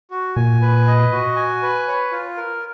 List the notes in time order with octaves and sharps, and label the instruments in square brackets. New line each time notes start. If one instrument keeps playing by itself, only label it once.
[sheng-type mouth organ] F#4
[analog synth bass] A#2 [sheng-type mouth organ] G#5
[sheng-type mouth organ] B4
D#5
F#4
G#5
B4
C#5
F4
A#4